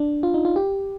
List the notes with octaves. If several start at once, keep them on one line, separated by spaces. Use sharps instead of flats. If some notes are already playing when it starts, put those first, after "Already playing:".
Already playing: D4
F4
D#4
F4
G4